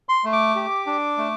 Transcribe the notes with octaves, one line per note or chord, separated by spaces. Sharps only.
C6
A3
D6
G4
D4
A3